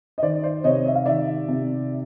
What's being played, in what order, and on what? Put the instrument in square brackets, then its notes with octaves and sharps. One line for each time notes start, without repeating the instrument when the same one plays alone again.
[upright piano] D#5
D#3 C5 D5
C5 D5
C3 C#5 D#5
E5
F5
D#3 D5 E5
C3